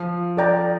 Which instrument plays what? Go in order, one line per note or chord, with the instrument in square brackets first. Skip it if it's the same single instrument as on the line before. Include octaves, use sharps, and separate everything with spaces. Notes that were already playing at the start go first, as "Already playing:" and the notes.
Already playing: [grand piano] F3
[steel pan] A4 D5 G5 A#5